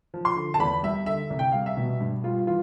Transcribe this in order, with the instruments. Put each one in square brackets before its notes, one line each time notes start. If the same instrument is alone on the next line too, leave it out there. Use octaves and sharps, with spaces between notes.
[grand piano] F3
C6
D3
A5
E2 B5
G3 E5
D3 E5
C2
G5
G3 F5
E5
B2
G2
G3 F4
E3 F4